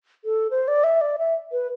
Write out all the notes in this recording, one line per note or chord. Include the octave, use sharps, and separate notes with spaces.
A4
C5
D5
E5
D5
E5
B4